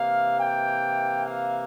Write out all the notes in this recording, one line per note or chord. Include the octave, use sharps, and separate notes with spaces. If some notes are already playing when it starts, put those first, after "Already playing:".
Already playing: C3 E3 A#3 F5
G5
F5